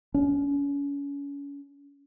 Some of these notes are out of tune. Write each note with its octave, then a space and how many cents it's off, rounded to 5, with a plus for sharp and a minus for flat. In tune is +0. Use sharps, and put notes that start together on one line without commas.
C#4 +35